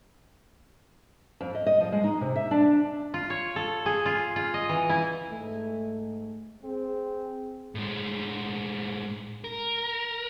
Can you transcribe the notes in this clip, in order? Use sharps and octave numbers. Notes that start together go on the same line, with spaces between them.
F2
D#5
D#5
F3
G#3
D#4
C3
E5
D4
F4
C#5
A4
G#4
F4
F4
D#5
E3
E4
G#2 A3
C4 G#4
A2 G#3
A#4